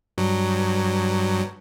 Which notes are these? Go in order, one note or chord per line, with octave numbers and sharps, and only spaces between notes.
G2 F#3